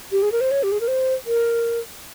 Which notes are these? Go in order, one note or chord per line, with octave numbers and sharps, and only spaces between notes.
G4
G#4
A#4
C5
C#5
G4
G#4
A#4
C5
A#4